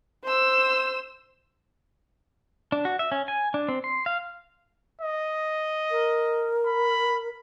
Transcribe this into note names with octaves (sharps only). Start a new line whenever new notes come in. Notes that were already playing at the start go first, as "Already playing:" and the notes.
C5 E6
D4
F#4
E5
C#4
G#5
D4
C4
C6
F5
D#5
A#4
B5